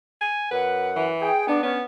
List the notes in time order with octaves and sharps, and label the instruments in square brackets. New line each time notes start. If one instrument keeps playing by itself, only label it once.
[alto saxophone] G#5
[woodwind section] F#2 F#5 [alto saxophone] B4
[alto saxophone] E3
[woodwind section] G#4 G5
[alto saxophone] B3 [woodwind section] D4
[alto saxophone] B3 [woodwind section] C#4